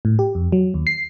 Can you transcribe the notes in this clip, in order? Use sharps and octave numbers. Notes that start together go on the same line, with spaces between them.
A2
G4
F2
F#3
D#2
C7